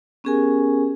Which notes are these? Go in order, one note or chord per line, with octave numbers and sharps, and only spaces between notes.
B3 C#4 G4 G#4 A#4 G#5